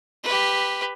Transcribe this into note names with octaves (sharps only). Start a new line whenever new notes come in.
G4 B4